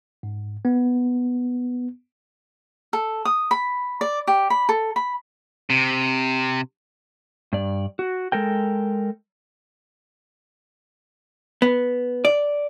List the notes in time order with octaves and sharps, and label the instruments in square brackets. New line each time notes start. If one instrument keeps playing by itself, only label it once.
[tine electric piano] G#2
B3
[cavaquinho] A4
D#6
B5
D5
G4
B5
A4
B5
[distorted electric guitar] C3
[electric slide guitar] G2 D5
F#4
G#3 A4 A#4 G5
[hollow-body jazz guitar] B3
D5